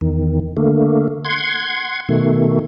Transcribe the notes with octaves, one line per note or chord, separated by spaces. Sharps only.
E2 D#3
D3 A3 A#3
F#5 C6 G#6
B2 D#3 A3